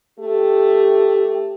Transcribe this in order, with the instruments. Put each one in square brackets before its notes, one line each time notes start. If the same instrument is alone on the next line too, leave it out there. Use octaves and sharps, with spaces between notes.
[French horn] A3 [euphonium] G4